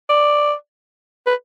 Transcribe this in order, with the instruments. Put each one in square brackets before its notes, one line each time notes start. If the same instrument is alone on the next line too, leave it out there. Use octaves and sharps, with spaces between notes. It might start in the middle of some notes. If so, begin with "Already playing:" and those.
[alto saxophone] D5
B4